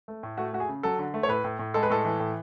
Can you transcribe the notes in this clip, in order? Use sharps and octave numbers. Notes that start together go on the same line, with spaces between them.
A3
A2
A3 F#4
A3 F#4
G#4
C#3
F#3 A4
D3
A3
C#5
A2 B4
A2
A2
G#3 A4
B4
A2 A4
E3
A2